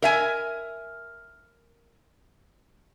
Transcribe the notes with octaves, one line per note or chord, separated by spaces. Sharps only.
A#4 E5 G#5